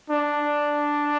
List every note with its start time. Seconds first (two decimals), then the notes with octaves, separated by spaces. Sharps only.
0.10 D4